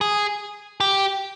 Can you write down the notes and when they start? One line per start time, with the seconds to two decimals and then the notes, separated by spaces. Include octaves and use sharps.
0.01 G#4
0.80 G4